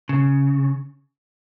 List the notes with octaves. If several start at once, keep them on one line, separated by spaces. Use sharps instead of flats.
C#3